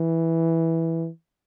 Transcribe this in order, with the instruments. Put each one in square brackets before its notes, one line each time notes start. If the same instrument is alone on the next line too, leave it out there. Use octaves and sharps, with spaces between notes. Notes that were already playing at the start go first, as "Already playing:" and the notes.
Already playing: [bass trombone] E3